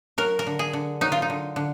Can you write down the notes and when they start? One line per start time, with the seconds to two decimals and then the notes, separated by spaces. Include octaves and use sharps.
0.18 F#3 A#4
0.39 A#4
0.47 D3
0.59 G#4
0.73 D3
1.01 F#3 D#4
1.12 F4
1.22 D#4
1.30 D3
1.56 D3